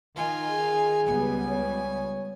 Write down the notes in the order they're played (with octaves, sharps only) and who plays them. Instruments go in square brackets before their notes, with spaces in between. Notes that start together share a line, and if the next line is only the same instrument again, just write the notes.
[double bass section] D#3 [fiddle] F4 G#5
[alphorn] G#4
[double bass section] C#2 G3 B3 [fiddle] G#5
[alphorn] C#5